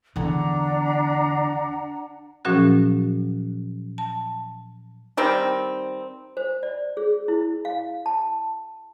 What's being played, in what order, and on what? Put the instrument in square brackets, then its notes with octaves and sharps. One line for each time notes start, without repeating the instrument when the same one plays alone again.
[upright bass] E2 D3 [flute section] D4 F#5 A#5
[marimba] A#2 F3 F#3 C#4 F#4 G#4
A5
[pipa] D#3 G3 C4
[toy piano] C5
D5
G#4
E4
F5
A5